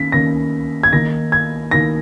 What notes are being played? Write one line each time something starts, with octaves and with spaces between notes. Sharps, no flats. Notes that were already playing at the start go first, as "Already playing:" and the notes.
Already playing: D#3 A#3 C#4 B6
D#3 A#3 C#4 A#6
G#6
D#3 A#3 D#4 A#6
G#6
D#3 A#3 D#4 A#6